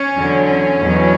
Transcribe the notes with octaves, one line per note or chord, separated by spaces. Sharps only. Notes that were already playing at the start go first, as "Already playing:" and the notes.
Already playing: C#4
E2 D3 F#3
C#4
E2 B2 F#3